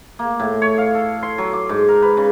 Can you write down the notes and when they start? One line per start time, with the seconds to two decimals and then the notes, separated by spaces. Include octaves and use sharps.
0.19 A#3
0.40 A2
0.62 C#5
0.78 F5
0.95 A4
1.23 C6
1.38 F#3
1.53 D6
1.69 G#2
1.89 A#4
2.02 B4
2.17 C#3